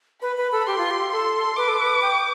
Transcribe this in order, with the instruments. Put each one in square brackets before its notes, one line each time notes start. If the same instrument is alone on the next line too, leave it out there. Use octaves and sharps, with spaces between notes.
[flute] B4 [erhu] B5
[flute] B4
A4
[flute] G4 [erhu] C6
[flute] F4
G4
[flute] A4 [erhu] C6
[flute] B4 [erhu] D6
[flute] A4
B4
G5